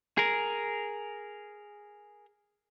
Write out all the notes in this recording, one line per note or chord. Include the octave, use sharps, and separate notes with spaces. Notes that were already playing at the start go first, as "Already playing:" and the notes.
G#4 A#4